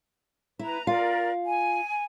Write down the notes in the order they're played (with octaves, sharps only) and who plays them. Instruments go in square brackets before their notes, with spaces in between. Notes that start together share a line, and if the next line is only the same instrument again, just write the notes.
[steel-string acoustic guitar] E4 [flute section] B4 A#5
[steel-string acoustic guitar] F4 F5 [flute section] A#4 D5
[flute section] G#5